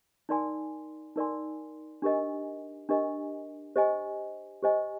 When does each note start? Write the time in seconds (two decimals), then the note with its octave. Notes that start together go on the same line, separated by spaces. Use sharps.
0.29 D#4 A#4 D5 G#5 C6
1.16 D#4 A#4 D5 G#5 C6
2.02 D4 G4 A#4 D#5 G#5
2.89 D4 G4 A#4 D#5 G#5
3.76 G4 C5 D#5 G#5
4.63 G4 C5 D#5 G#5